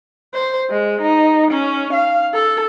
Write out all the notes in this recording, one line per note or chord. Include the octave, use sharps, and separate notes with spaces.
C5
G#3
D#4
C#4
F5
A4